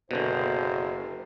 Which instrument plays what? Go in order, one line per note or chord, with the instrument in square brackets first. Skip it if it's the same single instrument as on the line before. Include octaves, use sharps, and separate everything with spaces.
[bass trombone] F#1 [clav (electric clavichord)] B2 D3 [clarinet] C5